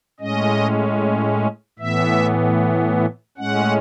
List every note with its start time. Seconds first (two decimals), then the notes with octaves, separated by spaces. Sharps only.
0.20 A2 G#3 C#4 D#5
1.79 A2 E3 B3 E5
3.37 A2 G#3 C#4 F#5